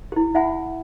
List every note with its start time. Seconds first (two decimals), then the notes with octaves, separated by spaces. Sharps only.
0.12 E4 G4
0.34 E4 E5 F#5 G#5 B5